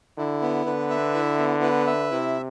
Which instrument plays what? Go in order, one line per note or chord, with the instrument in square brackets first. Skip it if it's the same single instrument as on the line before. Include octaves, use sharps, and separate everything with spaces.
[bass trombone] D3 [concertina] E4
[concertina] B3
[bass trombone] D3 [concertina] B4
[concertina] E5
E4
B3
B4
E5
[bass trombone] C3 [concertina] E4